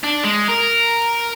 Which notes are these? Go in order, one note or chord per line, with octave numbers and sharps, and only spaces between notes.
D4
G#3
A#4